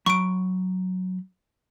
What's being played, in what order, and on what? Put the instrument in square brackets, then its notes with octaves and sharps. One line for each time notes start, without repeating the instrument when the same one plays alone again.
[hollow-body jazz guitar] F#3 B5 [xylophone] C#6 D7